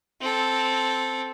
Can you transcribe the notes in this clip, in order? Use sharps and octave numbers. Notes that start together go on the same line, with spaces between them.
C4 A4